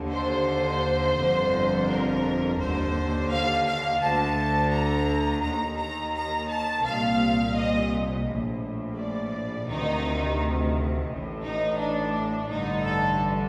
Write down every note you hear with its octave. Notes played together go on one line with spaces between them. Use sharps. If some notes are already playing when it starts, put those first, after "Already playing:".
Already playing: D#2 D3
C5
G1 F2 D3
A#4
D#2 D3 C5
F5
F5
D2 D3 A5
A#5
D#2 D#3 A#5
A#5
A#5
A5
C2 A#2 F5
D#5
A#1 A2
D5
D2 C3 D#3 D#4
A1 A2
D#4
D4
A1 G2 D3 D#4
A4